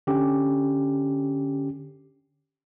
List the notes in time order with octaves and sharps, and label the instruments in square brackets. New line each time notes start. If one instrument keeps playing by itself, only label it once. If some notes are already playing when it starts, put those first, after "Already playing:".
[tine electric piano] D3 C#4 G4